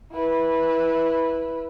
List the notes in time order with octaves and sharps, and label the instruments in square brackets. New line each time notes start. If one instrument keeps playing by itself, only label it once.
[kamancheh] E4 B4